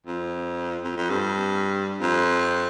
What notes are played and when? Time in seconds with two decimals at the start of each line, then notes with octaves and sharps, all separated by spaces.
0.07 F2
0.84 F2
0.97 F2
1.10 G2
2.01 F2